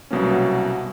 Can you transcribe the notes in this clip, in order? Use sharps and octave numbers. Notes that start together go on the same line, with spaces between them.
C2 B2 F#3 A#3 C#4